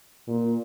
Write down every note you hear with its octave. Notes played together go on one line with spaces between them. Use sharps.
A#2